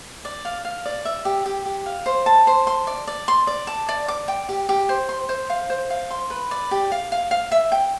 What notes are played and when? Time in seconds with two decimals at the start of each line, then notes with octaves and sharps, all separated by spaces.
0.25 D5
0.45 F5
0.65 F5
0.86 D5
1.05 E5
1.25 G4
1.46 G4
1.65 G4
1.86 F5
2.06 C5
2.26 A5
2.47 C5
2.67 C6
2.87 D5
3.07 D5
3.28 C6
3.47 D5
3.67 A5
3.89 D5
4.08 D6
4.28 G5
4.49 G4
4.69 G4
4.89 C5
5.09 C6
5.29 C5
5.50 F5
5.70 C5
5.90 F5
6.11 C6
6.30 B4
6.51 D5
6.71 G4
6.92 F5
7.12 F5
7.31 F5
7.52 E5
7.72 G5